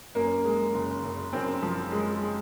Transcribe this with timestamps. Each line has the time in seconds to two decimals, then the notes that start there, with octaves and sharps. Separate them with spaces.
0.15 F#2 A#3
0.45 G#3
0.74 F#1
1.04 F#1
1.33 F#2 C4
1.62 F3
1.92 G#3
2.22 G#3